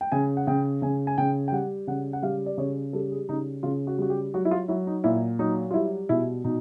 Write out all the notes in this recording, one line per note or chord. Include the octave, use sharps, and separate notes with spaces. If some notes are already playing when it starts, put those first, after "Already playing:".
G5
C#3 G#5
F#5
C#3 G5
C#3 G#5
G#5
C#3 G5
G5
G3 F#5
C#3 F#5
F#5
G3 F5
D5
C#3 C#5
G3 A4
G#4
C#3 D#4
C#3 F4
F#4
G3 F#4
G4
F#3 F#4
E4
F4
F#3 E4
D#4
A#2 E4
F#3 D#4
F4
G3 E4
B2 E4
B2 D#4